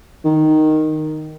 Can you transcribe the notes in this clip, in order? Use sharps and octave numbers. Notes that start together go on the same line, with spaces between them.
D#3